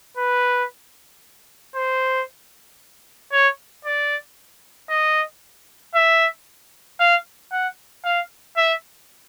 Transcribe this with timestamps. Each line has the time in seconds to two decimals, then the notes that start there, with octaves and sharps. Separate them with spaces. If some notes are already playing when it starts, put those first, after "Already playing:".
0.17 B4
1.76 C5
3.32 C#5
3.85 D5
4.90 D#5
5.95 E5
7.00 F5
7.52 F#5
8.05 F5
8.57 E5